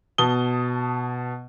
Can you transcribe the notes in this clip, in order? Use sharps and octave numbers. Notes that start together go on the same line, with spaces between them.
B2 A5 D#6 G7